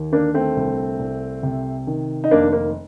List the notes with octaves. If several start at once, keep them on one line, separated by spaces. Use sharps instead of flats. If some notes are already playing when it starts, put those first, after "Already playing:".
Already playing: D#2
D3 A#3 D4
A3 C4
C2
C2
C3
D#3
D#4
F1 A#3 D4
A#3